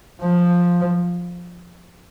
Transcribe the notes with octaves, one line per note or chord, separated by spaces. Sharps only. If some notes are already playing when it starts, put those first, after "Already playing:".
F3